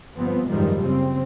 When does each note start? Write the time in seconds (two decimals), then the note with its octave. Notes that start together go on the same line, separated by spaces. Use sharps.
0.16 G1 F3 B3 C4
0.48 F#1 G#2 D#3 F3 G3 G#3
0.82 C#3 C4